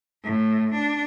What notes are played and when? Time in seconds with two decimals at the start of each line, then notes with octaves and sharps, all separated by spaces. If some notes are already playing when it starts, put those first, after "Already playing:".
0.24 A2
0.74 D4